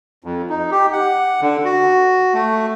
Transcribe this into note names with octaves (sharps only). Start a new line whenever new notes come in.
F2
D#4
G4
F#5
D3
F#4
A3